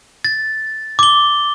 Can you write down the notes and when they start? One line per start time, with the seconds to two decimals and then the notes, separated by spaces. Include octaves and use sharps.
0.24 A6
0.99 D6 G7